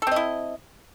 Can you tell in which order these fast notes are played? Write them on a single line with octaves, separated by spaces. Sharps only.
A4 C4 D#5 E4